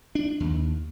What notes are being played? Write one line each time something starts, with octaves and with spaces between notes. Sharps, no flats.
D4
D#2